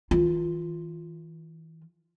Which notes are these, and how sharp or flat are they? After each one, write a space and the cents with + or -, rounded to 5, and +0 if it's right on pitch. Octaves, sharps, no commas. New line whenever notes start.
E3 -35 F4 +0